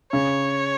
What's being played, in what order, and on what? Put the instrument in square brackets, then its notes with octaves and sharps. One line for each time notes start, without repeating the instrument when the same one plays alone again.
[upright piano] C#3 [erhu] C#5